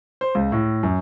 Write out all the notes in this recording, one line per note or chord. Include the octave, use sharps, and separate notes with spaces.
C5
C#2
A2
F#2